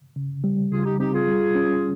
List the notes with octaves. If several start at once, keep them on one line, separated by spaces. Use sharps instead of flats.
C#3
G3
C#3 F4 G#4
D#4 G4
C4 D#4 G4
F4 G#4
G3
C#4